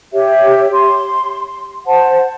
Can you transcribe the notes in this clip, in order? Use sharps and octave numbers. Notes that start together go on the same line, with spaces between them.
G4 C#5 E5
C6
C5 F#5 A5